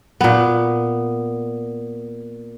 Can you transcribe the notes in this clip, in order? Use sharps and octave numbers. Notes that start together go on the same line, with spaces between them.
A#2 B3